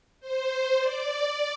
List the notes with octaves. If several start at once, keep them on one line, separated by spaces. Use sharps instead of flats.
C5
D5